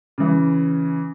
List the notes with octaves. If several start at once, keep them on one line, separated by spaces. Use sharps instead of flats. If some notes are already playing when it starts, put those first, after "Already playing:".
C#3 E3